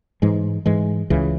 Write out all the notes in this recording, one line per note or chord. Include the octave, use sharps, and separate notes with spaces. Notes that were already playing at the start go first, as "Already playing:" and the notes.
G#2 E3 G#3
G#2 E3 G#3
C#2 C#3 E3